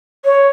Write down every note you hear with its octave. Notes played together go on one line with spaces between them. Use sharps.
C#5